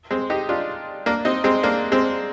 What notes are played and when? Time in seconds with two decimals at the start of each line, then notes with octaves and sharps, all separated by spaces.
0.11 G#3 C4
0.30 D#4 G4
0.49 D4 F4
1.06 A#3 D4
1.25 C4 D#4
1.44 G#3 C4
1.63 A#3 D4
1.92 G#3 C4